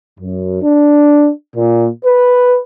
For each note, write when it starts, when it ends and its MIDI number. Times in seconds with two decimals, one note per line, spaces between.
0.20 0.59 42
0.62 1.30 62
1.56 1.88 46
2.06 2.60 71